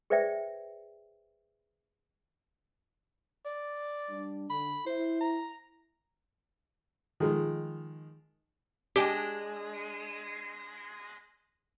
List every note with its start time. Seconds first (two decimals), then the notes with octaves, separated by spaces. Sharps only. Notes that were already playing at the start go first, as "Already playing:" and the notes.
0.10 G#4 B4 C5 D5 E5 G5
3.45 D5
4.09 G3 D4
4.50 D3 B5
4.86 E4 C5
5.21 A#5
7.20 D#3 F3 G#3
8.96 G#3 D4 G4